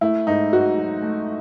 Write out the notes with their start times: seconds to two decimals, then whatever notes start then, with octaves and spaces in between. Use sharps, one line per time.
0.01 A3 E4
0.27 G#2 D#4
0.53 G#2 F#4
0.77 F#3
1.02 A3